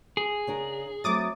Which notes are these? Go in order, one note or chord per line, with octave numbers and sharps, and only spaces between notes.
G#4
C#3 D4 A#4
F#3 A3 C4 D6 D#6 A6